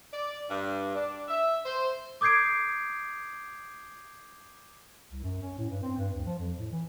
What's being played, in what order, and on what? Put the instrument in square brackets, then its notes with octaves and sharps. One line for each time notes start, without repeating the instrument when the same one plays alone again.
[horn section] D5
G2
D4
E5
C5
[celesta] D6 D#6 G6 G#6 C7 D7
[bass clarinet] C2
F#2
C#4
A2
G2
C4
G2
D2
F3
F2
A2
E3